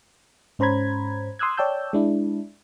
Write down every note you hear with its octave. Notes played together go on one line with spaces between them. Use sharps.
G#2 C#4 C5 A#5 B5 G#6
C6 D#6 E6 F#6 G#6
C#5 D5 G5 A5 E6 G6
G#3 D4 E4